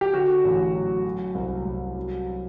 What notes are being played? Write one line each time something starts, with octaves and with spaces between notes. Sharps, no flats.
G4
D3 F#4
A1
F#3
F#3
C2
C2
F#3